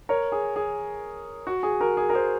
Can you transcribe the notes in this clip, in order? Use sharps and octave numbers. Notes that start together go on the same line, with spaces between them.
A#4 C#5
G#4
G#4
F#4
G#4
F#4 A#4
G#4
A#4
G#4 C5